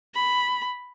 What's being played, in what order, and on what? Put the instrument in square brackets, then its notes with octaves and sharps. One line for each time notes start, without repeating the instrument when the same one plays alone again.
[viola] B5